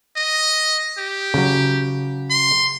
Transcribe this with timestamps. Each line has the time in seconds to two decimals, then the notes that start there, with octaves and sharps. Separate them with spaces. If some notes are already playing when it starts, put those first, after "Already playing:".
0.16 D#5
0.98 G4
1.34 C#3 F#3
2.30 C6